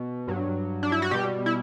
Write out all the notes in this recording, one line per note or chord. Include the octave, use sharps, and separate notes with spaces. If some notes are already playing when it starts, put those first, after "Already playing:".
Already playing: B2
G2 F#3
D4
E4
F#4
B2 G3 G4
E4